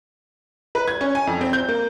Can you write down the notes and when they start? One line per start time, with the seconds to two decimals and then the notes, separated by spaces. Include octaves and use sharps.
0.75 B4
0.88 G#6
1.01 C#4
1.15 G#5
1.27 F2
1.41 C4
1.53 G6
1.68 A#3